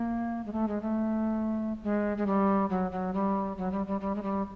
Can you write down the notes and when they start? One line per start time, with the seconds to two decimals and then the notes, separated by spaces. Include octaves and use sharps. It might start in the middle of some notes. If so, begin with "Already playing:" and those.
Already playing: A#3
0.46 G#3
0.53 A3
0.68 G#3
0.82 A3
1.83 G#3
2.17 G#3
2.27 G3
2.70 F#3
2.91 F#3
3.14 G3
3.58 F#3
3.72 G3
3.87 G3
4.01 G3
4.15 G#3
4.23 G3